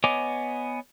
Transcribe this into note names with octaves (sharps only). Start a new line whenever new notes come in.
B3 C#5 D#5 G#5 D6